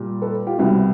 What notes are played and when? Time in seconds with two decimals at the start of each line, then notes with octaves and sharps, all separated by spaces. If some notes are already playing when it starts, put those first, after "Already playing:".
Already playing: A#2 G3
0.22 A4 B4
0.47 F4 G4
0.58 C2 B2 G3 E4 F#4